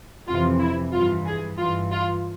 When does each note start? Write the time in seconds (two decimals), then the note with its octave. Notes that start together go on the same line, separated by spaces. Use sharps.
0.27 F2 C3 E3 F4
0.59 E4
0.92 G2 E3 F4
1.26 G#4
1.58 G2 E3 F4
1.91 F4